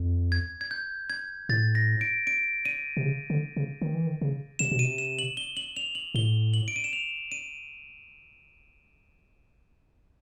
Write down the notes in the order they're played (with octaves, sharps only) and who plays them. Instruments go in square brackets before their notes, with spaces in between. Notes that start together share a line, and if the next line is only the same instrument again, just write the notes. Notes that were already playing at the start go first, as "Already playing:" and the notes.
Already playing: [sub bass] F2
[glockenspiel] G#6
G#6
G6
G#6
[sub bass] A2 [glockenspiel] A6
[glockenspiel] A#6
D7
D7
D#7
[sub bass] C3
C#3
D3
C#3
D#3
E3
D#3
C#3
[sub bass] C3 [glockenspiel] E7
[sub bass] B2
[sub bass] C3 [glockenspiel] D#7
[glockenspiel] E7
F#7
G7
F#7
F7
F#7
[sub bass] A2 [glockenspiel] G7
[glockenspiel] F#7
D7
D#7
E7
F7
D#7